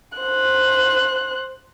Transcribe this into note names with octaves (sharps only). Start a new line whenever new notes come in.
C5 F#6